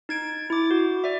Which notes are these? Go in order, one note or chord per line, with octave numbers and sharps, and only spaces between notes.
D#4 G#6 D7
E4 D6
F#4
D5 E5